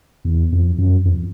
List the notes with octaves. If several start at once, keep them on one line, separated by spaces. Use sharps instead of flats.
E2
F2
F#2
F2